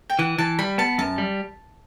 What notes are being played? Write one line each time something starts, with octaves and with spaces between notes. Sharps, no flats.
G5
E3 F#5
E3 A5
G3 B5
B3 A5
F#2 A5
G3